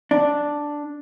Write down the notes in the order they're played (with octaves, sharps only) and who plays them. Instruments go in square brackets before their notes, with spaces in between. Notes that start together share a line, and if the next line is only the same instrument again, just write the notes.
[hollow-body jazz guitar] D4